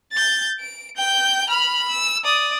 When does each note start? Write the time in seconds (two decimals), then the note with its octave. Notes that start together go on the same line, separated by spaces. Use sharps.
0.12 G6 A6
0.60 D7
0.97 G5 G6
1.49 B5 F6
1.89 E6
2.24 D5 D#6